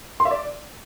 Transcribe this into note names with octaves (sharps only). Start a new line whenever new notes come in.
C6
E5
D5